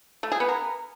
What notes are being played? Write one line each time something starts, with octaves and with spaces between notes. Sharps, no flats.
A3
G#4
B3
A#4